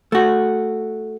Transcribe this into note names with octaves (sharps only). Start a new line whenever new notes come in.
A3 F#4